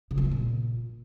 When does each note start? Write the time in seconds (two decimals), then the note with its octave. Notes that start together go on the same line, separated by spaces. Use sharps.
0.11 C#3
0.18 A#3
0.25 G#3
0.32 A#2